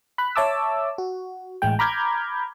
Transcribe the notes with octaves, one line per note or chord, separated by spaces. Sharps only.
B5 F#6
C#5 E5 A5 D6 E6
F#4
A1 A2 G#3 G5
A#5 B5 D6 F6 G6 G#6